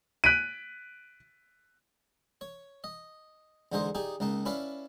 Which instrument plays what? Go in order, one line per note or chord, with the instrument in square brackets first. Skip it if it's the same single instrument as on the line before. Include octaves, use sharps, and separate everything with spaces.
[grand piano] F#6 B6 D7 D#7
[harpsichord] C#5
D#5
E2 D3 G#3 D#4 C5 D#5
D#4 G4 G#4 D5
C#2 A#3 D#4 A5
C#4 E4 B4 D5 F5 A5